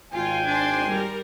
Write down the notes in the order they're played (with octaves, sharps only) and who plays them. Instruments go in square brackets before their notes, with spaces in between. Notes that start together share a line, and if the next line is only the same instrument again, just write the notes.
[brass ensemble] G#1 G5 G#5 [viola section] F4
[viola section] D4 C5 C6
G3 A#4